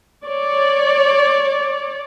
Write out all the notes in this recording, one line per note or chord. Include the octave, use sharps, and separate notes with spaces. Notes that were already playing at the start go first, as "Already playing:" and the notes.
C#5 D5